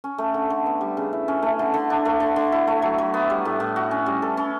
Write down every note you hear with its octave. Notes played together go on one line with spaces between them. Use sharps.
C#4
A3
D3
D3
B3
G3
C#3
E4
C#4
A3
D3
D3
D4
A3
D3
D3
E4
A3
F#3
F#3
B3
G3
A2
A2
F#4
C#4
G3
A4
C#4